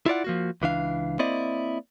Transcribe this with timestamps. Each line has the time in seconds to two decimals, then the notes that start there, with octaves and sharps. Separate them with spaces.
0.06 E4 F4 D5 F#5
0.24 F3 A#3 F#4
0.62 C#2 E3 D4 F5
1.19 A#3 C4 E4 D5 D#5